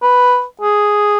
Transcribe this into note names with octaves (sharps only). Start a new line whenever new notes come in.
B4
G#4